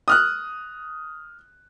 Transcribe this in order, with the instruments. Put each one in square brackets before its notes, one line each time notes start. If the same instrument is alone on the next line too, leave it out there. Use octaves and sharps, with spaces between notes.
[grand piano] D#6 F6 F#6